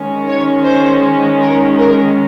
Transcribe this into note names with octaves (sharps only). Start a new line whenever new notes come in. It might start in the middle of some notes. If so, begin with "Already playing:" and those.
Already playing: D#3 G#3 C#4
C#5
C5
A#4
A#4